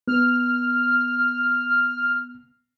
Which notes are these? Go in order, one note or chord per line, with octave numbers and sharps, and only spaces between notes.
B3 F6